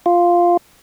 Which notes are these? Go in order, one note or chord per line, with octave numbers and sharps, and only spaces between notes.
F4